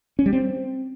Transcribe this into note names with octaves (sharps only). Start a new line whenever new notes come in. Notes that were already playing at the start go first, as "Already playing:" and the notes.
C#4
G3
C4